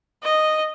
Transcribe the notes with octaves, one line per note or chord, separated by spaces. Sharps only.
D#5